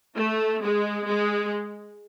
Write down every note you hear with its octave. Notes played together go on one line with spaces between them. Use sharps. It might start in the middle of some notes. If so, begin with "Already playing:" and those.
A3
G#3
G#3